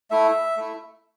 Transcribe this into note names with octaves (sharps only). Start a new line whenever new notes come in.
A3 E4 E5
A3 E4